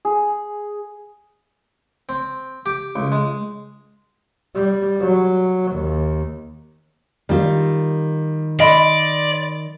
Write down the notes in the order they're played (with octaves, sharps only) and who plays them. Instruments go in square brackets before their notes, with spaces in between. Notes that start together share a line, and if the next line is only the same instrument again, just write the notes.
[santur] G#4
[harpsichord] C4
G4
C#2
G#3
[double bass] G3
F#3
D#2
[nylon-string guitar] D#3 F4 [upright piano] G3
[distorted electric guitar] D5 [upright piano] D#5 B5 C6